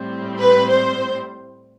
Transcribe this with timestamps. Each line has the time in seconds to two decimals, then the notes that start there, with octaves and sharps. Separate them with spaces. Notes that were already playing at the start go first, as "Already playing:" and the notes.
Already playing: A2 G3 C4
0.39 B4
0.68 C5